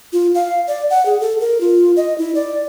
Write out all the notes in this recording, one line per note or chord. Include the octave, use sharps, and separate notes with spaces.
F4
F5
D5
F#5
G#4
A4
A#4
F4
D#5
E4
D5